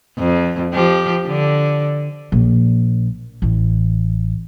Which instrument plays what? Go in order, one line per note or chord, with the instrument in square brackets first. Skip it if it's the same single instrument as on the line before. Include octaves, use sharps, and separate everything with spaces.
[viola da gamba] F2
F3 G4
D3
[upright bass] A#1
A1